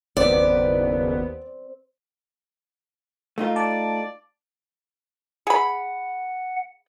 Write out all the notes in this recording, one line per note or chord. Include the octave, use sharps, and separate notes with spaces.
F#1 D#2 B3 C4 D5
A3 D#4 F4
D5 A5
G#4 F#5 B5